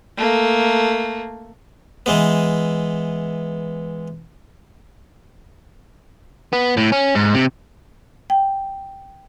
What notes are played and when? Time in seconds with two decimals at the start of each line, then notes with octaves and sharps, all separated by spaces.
0.17 A3 A#3
2.06 E3 G#3 B3
6.53 B3
6.77 A2
6.92 C#4
7.15 G#2
7.34 C3
8.30 G5